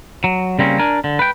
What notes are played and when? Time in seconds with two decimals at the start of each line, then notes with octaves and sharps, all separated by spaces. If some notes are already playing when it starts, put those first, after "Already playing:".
0.24 F#3
0.59 C#3 G3 A#3 C4 C#4
0.79 D4 A#4 G#5
1.04 D3
1.19 B4 G5